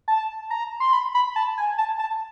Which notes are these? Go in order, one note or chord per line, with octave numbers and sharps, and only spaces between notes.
A5
A#5
C6
B5
B5
A5
G#5
A5
A5